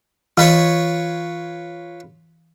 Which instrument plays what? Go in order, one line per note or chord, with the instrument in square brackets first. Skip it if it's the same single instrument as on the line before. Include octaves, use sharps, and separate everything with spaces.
[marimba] E3 [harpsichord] F4 B4 C#5